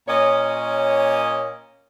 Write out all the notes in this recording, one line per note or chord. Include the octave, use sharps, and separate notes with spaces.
A#2 C#4 C#5 D#5